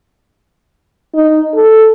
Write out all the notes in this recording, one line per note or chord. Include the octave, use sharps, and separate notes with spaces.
D#4
A4